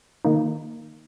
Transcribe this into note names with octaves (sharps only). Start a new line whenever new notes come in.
D#3 A#3 D#4